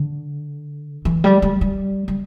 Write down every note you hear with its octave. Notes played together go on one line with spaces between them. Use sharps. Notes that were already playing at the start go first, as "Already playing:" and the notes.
Already playing: D3
E3
G3
G3
G3
G3